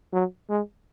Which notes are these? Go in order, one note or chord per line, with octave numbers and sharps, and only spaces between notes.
F#3
G#3